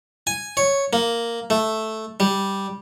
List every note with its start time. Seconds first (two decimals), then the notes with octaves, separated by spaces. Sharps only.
0.27 G#5
0.57 C#5
0.93 A#3
1.50 A3
2.20 G3